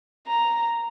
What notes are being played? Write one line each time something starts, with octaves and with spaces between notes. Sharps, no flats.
A#5